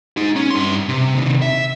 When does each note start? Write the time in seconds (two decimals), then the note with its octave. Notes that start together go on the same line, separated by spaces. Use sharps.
0.17 D#4 G#4
0.36 C#4
0.50 G2 C6
0.89 C3
1.15 C3 D#3
1.42 E5